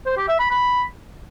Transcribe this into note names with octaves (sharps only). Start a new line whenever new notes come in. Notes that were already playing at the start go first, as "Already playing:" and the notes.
C5
G4
E5
B5
B5